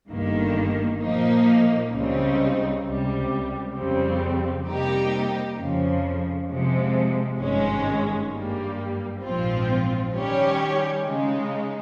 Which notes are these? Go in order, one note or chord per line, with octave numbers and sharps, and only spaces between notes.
G1 G2 D#3 A#3
A#2 F3 A#3 D#4
C#2 C#3 G3 C4 D#4
C#2 C3 G3
F2 C#3 G3 C4
C3 G3 A#3 D#4 G4
F2 C#3 F3
C3 F3 G#3
G#1 G2 D#3 G#3 C#4
G2 G3 A#3
A#1 G#2 F3 C4 F4
D#3 G3 C#4 G4 C#5
C#3 G#3 D#4